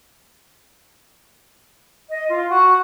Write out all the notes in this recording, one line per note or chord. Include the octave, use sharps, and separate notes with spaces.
D#5
F4
F#4